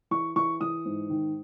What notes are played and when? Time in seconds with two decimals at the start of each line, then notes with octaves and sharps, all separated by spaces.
0.11 E3 C#6
0.36 E3 C#6
0.61 E3 D#6
0.85 G#2
1.10 D#3